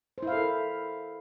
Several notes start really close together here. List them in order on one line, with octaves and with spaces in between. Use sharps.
C5 E4 F5 A4 A#4